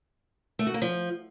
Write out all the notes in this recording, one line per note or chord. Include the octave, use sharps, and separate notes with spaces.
A3
F#4
A#3
F3